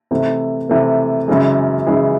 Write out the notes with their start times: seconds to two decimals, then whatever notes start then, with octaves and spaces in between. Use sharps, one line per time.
0.11 C3 E3 A3
0.69 C3 E3 A3
1.28 F#2 C#3 E3 G#3
1.86 F#2 C#3 E3 G#3